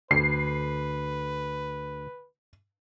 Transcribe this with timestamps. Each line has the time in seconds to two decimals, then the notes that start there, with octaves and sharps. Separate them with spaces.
0.11 D2 B4 C7